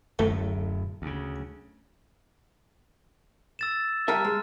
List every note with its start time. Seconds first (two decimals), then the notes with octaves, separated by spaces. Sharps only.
0.19 D1 F#2 A2 A3
1.02 D2 C#3
3.59 E6 A6 E7
4.08 G3 A#4 E5 A5 F6
4.25 G#3